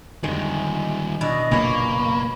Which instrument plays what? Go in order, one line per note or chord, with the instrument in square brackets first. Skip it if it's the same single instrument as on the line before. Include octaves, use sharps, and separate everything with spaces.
[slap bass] F2 D3 [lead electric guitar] D#3 G3 [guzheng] G#3
[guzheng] B2 D4 E4 [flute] D#5
[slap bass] F#1 A#2 B3 [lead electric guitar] A#3 [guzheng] G#4 C#5 [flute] B5